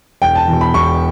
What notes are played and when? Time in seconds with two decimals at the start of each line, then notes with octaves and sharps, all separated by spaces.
0.22 E1 G5
0.35 A5
0.48 E2 B2
0.61 B5
0.74 E1 C#6